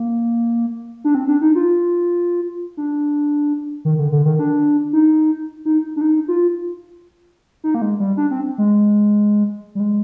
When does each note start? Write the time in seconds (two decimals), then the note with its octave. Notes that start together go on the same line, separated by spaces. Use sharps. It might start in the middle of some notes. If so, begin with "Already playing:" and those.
Already playing: A#3
1.04 D4
1.15 C4
1.28 D4
1.41 D#4
1.55 F4
2.77 D4
3.85 D#3
3.99 D3
4.12 D3
4.25 D#3
4.39 D4
4.93 D#4
5.65 D#4
5.96 D4
6.01 D#4
6.28 F4
7.64 D#4
7.75 A#3
7.82 G#3
8.00 G3
8.17 D4
8.31 C4
8.58 G#3
9.75 G3
9.80 G#3